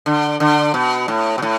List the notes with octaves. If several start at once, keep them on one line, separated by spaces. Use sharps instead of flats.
D3
D3
B2
A2
B2
A2